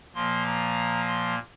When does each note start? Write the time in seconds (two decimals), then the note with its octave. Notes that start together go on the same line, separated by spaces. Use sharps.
0.14 A#2 F3 A#3 C6
0.45 A#5
1.08 C6